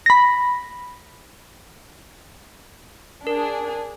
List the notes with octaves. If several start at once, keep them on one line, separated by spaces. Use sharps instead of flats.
B5 A#6
D4 G#4 A#4